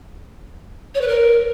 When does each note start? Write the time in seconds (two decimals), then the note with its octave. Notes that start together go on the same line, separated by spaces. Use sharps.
0.94 C#5
1.01 B4
1.07 A#4